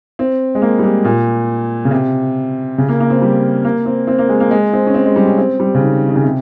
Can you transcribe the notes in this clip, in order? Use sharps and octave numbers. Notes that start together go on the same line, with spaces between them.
C4
G#3
A#3
G3
G#3
A#2
C#3
C3
C#3
A#3
A#3
C4
G3
A#3
C4
C4
A#3
G#3
A#3
G#3
C4
C#4
C4
G#3
G3
C#4
C4
G3
C#3
D#3
D#3
C#3
C3